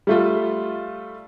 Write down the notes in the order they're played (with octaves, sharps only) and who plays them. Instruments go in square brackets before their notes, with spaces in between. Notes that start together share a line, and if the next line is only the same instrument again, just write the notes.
[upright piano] G3 A3 F4